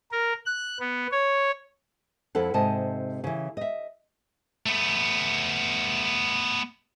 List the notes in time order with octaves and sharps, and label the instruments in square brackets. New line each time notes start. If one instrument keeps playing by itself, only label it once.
[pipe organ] A#4
F#6
B3
C#5
[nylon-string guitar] F2 E4 A4 F#5
G#2 C3 D#5 A5
C#3 E3
D#5 E5
[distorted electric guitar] A3 B3